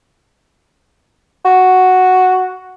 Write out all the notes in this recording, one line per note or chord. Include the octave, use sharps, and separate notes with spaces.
F#4